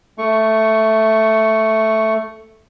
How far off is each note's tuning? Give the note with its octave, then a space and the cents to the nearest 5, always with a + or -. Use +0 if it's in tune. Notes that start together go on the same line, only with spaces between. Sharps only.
A3 +0 C#6 +0